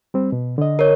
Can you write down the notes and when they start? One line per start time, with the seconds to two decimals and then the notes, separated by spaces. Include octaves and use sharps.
0.14 G3 C4
0.32 B2
0.58 D3 D#5
0.79 A#4 C#5